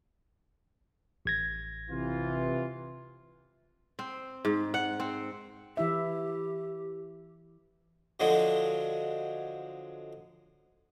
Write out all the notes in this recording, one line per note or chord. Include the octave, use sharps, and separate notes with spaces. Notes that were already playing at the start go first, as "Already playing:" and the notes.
A1 G#6 A#6
C3 E3 F4
C4
G#2
F#5
C4
E3 E4 G4 E5
D3 F3 F#3 G#3